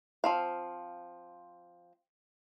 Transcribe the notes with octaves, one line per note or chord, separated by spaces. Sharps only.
F3 C4 F5